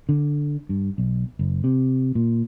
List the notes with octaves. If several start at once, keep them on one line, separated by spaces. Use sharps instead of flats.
D3
G2
B1
F#1
C3
A#2